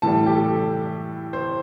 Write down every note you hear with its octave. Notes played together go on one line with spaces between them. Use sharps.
A2 E3 G3 A5
G4
A4
C5